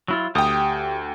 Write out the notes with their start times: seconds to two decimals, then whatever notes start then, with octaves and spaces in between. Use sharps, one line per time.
0.08 F#3 E4 F4
0.35 D2 G4 G5 D#6